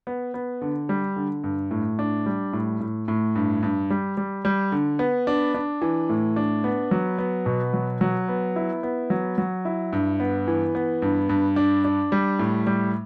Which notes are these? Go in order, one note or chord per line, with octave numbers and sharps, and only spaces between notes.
B3
B3
D3
G3
D3
G2
A2
D4
G3
A2
A2
A2
G2
G2
G3
G3
G3
D3
B3
D4
D4
E3
A2
D4
B3
F#3
B3
B2
F#3
F#3
B3
E4
B3
F#3
F#3
E4
G2
B3
E3
B3
G2
G2
D4
D4
G3
A2
G3